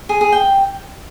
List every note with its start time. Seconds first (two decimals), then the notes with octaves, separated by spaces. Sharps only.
0.09 G#4
0.21 G#4
0.32 G5